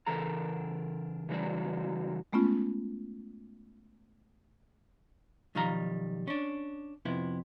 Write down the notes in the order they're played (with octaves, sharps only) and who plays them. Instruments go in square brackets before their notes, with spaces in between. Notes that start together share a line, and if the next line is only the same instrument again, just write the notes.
[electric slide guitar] C#3 E3 A4 A#4 A5 A#5
C#3 E3 F#3 G3 F#4 D5
[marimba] G#3 A3 B3 C#4 F4
[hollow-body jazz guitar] B1 D#3 F3 G3 F5 A#5
C#4 D4
F2 C3 B3 E4